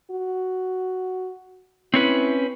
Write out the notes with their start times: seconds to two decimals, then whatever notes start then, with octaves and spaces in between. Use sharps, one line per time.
0.11 F#4
1.94 C4 C#4 E4 B4